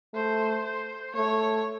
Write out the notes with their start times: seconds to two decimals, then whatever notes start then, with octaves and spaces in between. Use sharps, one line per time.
0.14 A3 C5
0.64 C5
1.15 A3 C#5